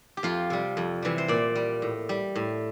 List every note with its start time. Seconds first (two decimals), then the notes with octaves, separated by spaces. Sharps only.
0.17 G4
0.23 F2 F4
0.50 C3 G3
0.77 F2
1.02 C3 E3 G3
1.18 C5
1.28 A#2 D5
1.55 G3
1.82 A2
2.09 G3
2.35 A2